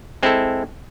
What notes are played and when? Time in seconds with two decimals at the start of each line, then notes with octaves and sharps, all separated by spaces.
0.23 G#3 C4 E4 A4